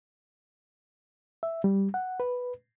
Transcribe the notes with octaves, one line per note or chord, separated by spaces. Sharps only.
E5
G3
F#5
B4